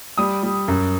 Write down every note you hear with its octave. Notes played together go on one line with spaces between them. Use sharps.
G3 D#6
G3
F#2